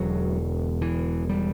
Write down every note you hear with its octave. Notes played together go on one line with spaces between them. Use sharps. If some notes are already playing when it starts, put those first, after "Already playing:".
Already playing: E1 E2 D3 F#3
E3
G3